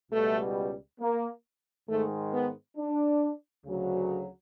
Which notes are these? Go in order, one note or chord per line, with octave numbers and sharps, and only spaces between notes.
C#2 B2 G3 A3
A#3
G#2 D#3 G#3 A3
B3
D4
D2 C#3 F#3